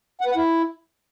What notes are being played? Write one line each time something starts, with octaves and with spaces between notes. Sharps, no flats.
F#5
B4
F#5
E4